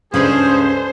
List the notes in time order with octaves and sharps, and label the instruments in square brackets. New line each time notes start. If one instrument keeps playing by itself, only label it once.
[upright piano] C#2 G2 [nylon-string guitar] C#4 B4 D5 [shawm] G#4 [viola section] A4 C5